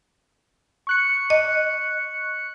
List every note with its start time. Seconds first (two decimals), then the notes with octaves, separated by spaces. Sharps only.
0.87 C#6 F#6 C#7
1.30 D#5